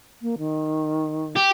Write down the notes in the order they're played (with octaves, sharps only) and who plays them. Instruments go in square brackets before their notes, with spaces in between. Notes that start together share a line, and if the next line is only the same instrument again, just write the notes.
[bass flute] A#3
D#3
[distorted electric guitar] G4